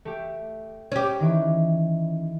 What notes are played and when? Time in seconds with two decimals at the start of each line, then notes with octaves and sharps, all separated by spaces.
0.05 A3 G4
0.92 C#4 G4
1.20 D#3 E3